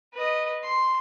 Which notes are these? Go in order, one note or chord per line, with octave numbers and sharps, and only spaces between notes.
B4 D#5
C6